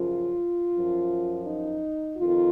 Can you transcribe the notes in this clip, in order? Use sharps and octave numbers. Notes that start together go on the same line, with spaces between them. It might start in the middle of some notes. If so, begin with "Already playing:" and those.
Already playing: F#2 C#3 F3 F4
F#2 F3
D#4
F2 D#3 F4